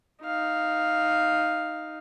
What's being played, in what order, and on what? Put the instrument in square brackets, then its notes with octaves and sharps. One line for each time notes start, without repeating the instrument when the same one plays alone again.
[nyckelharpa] D#4 F5